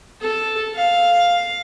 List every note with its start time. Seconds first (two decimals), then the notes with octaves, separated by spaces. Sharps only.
0.21 A4
0.75 F5